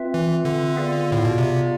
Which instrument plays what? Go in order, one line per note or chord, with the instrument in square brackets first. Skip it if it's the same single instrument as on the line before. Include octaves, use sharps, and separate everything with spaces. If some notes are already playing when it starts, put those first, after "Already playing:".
Already playing: [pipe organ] C4 F4 B4 E5
[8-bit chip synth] E3
D3
[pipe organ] B3 F4 G#4 D5 F5
[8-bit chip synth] A2
B2
C3